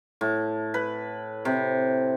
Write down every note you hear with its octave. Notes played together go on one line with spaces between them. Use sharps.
A2
B4
C3